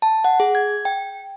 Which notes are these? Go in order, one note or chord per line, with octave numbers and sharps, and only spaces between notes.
A5
F#5
G#4
G#6
G5